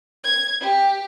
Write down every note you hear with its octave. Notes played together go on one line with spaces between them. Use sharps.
G#6
G4